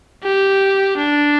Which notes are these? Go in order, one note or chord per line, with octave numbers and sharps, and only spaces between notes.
G4
D4